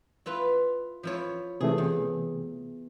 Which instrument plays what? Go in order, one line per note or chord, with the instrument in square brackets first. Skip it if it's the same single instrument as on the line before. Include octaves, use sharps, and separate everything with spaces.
[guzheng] E4 F4 B4
F3 E4 C#5
[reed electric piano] C3 E3 A3 [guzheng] G#4
[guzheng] E2